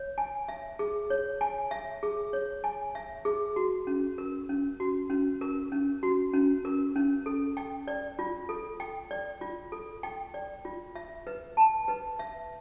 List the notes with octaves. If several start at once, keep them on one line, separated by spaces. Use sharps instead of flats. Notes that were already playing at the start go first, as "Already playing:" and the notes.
Already playing: C#5
G#5
E5
G#4
C#5
G#5
E5
G#4
C#5
G#5
E5
G#4
F#4
C#4
A#4
C#4
F#4
C#4
A#4
C#4
F#4
C#4
A#4
C#4
A4
G5
D5
F4
A4
G5
D5
F4
A4
G5
D5
F4
E5
B4
A5
B4
E5